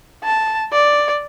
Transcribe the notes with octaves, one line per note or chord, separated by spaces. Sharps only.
A5
D5